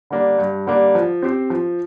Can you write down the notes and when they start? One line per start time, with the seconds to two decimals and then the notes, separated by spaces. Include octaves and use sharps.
0.10 D3 G3 A#3 D4
0.39 G2
0.67 D3 G3 A#3 D4
0.95 F3
1.22 C4 G4 C5
1.50 F3